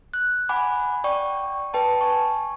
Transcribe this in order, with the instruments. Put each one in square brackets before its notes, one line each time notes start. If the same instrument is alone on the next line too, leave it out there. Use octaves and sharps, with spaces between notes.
[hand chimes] F#6
F#5 G#5 B5 D6
D5 G5 C#6
B4 G5 A5
G#5 A5 C#6